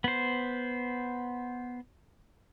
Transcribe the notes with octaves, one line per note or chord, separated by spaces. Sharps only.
B3 C5